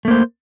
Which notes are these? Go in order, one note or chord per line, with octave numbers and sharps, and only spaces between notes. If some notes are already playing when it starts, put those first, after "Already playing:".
A3 A#3 C5